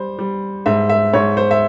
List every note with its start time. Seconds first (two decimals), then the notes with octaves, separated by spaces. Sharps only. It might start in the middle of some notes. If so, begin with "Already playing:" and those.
Already playing: G3 C5
0.19 G3
0.66 G#2 E5
0.89 E5
1.13 G#2 C#5
1.37 C5
1.51 E5